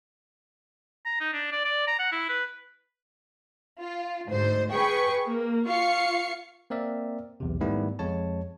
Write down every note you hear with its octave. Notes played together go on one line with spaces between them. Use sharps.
A#5
D#4
D4
D5
D5
A#5
F#5
E4
B4
F4
D2 G#2 C5
G#4 B4 G5 C#6
A#3
F4 F5 C#6 C7 C#7
A#3 C4 A#4 D5 E5
B1 E2 C3
G#2 D#3 G3 A3 B3 E4
F2 G#3 C#5 A5